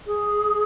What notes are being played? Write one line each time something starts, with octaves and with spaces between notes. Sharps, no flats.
G#4